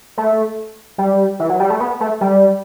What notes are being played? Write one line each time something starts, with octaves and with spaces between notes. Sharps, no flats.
A3
G3
E3
F#3
G3
A3
B3
A3
G3